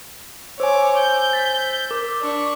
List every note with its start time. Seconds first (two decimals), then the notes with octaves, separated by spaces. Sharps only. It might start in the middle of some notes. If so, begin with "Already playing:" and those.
0.60 C5 C#5 G#5 D6 E6
0.98 G6
1.33 A6 B6
1.91 A#4 D6
2.22 D4 C#6